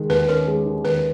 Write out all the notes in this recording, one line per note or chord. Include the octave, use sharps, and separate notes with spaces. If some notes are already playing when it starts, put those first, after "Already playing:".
Already playing: D#3 G#3
D#2 B4
C#4 A#4
G#3
D#3
D#2 B4